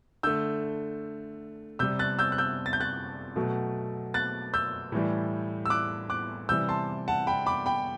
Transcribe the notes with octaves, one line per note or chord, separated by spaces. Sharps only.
D3 A3 E6 G6
C3 G3 E6 G6
F#6 A6
E6 G6
F#6
E6 G6
A6
G6
F#6 A6
B2 F#3 A3
F#6 A6
E6 G6
A2 E3 G3
E6
D6 F#6
D6 F#6
C3 E3 G3 E6 G6
A5 C6
F#5 A5
G5 B5
B5 D6
G5 B5